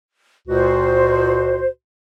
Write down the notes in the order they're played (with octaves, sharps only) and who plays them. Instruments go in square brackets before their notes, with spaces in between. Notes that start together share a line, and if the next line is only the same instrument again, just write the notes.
[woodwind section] C#2 A#2 F#4 [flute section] C5